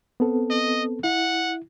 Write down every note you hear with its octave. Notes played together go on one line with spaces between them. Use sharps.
B3 C4 A4
D#5
E4 F#5